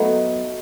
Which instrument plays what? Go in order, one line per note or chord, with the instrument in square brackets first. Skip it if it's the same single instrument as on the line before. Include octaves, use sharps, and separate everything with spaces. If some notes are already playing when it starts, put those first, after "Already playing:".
Already playing: [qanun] F#3 B3 D#4 [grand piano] A3